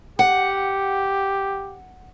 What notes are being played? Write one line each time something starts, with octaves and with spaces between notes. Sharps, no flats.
G4 F#5